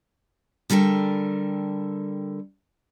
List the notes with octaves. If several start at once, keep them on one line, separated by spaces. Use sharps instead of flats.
D3 G3 A4 A#4 G5